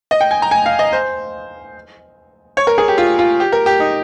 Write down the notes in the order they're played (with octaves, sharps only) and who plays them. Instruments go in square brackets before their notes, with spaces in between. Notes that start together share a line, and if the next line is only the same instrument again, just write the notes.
[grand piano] D#5
G5
G#5
A#5
G#5
F5
D#5
C5
C#5
A#4
G#4
G4
F4
F4
G4
A#4
G4
D#4